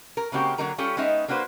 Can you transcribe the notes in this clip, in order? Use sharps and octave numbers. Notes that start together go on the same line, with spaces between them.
A#4
C#3 G#3 A#3 C4 F#4 G4
D3 F#3 A#3 D#4 A#4 A#5
G3 C#4 F4 G4 A4
G#3 B3 C#4 D#4 D#5 E5
A#3 D4 F#4 B4 C5